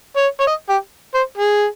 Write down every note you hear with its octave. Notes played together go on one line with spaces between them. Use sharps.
C#5
C#5
D#5
G4
C5
G#4